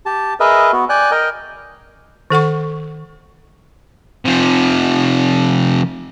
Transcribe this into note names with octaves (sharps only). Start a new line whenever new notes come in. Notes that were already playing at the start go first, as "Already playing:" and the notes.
G4 A5
G#4 A#4 B4 D#5 E5
B3 F#4
D5 G5 G#5 F#6
A#4 D#5 G5
D#3 A4 F#5 C#6
C3 F3